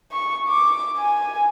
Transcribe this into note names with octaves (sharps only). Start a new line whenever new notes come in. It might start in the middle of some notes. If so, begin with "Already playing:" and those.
C#6
D6
G#5